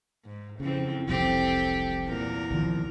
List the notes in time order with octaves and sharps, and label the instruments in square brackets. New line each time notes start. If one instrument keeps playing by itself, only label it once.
[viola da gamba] G#2
[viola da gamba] F2 E3 C4 [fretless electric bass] C#3
[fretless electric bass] F1 C2 F2 [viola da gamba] C4 G4 A4
[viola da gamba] E2 A#2 A#4
[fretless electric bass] C2 D#3 F3